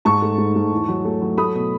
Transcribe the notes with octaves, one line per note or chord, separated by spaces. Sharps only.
G#2 A5 C#6
A3
G#2
G#2
E2
F#3
A3
F#3
A3 B5 D#6
B2